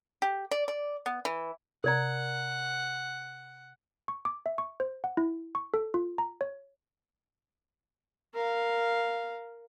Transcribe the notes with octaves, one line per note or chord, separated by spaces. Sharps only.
G4
D5
D5
B3
E3
C3 A#4 D5 F#5 A#5
C#6
D6
E5
C#6
C5
F#5
E4
C#6
A4
F4
A#5
C#5
A#4 F5